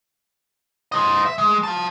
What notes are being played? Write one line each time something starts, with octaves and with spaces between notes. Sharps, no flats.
C5 D#5
E5
G#3
F5 A5